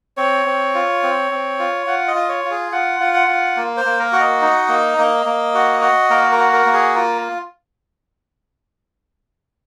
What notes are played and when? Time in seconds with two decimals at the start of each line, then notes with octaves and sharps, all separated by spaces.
0.17 C4 C#5
0.46 C4
0.75 F4
1.03 C4
1.31 C4
1.59 F4
1.86 F4 F#5
2.08 D#5
2.15 F4
2.29 C#5
2.44 F4
2.51 G#4
2.72 F4 F#5
3.00 F4
3.14 F#5
3.27 F4
3.57 A#3
3.77 C5
3.85 A#3
3.99 A#4
4.12 F#4
4.20 D#5
4.41 D#4
4.69 A#3
4.98 A#3
5.26 A#3
5.54 F#4
5.81 F#4
6.10 A#3 A#4
6.31 A#4
6.38 F#4
6.53 A#4
6.66 A#3
6.73 G#4
6.95 F4 A#4